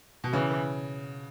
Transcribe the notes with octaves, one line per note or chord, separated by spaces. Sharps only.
B2
C#3 E3